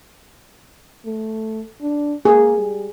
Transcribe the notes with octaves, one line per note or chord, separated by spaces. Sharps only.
A3
D4
A#3 G#4
G3